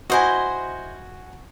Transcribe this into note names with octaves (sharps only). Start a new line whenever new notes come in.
E4 F#4 C5 D#5 G#5